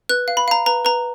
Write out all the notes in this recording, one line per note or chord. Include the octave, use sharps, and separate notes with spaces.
B4 F#6
F5
B5
F5 A#5
B4 A#5
B4 A#5